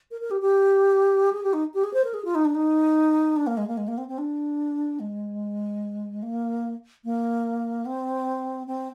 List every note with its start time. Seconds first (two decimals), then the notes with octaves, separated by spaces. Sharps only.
0.11 A#4
0.21 A#4
0.31 G4
0.41 G4
1.33 G#4
1.43 G4
1.53 D#4
1.74 G4
1.84 G#4
1.94 C5
2.04 A#4
2.14 G#4
2.25 F4
2.35 D#4
2.45 D4
2.55 D#4
3.36 D4
3.47 A#3
3.57 G#3
3.67 A#3
3.77 G#3
3.88 A#3
3.98 C4
4.08 C4
4.18 D4
5.00 G#3
6.23 A#3
7.04 A#3
7.86 C4
8.67 C4